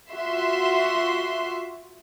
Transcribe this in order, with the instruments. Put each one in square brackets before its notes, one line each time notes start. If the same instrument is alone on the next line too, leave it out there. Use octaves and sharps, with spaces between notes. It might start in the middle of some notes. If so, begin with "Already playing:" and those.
[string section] F4 F#4 E5 C6